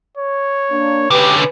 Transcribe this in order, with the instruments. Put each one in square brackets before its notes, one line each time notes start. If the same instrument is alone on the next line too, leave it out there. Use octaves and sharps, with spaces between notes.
[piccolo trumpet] C#5
[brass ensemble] A#3 D4
[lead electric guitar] D3 C#4 [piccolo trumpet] G4 [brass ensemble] B4